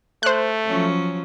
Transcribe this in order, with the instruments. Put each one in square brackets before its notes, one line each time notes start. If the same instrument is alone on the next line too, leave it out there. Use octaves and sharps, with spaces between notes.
[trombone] A3 [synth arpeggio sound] C5 F#6
[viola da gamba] F3 F#3 C#4